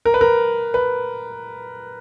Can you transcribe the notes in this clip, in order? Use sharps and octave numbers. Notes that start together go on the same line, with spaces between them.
A#4
B4
A#4
B4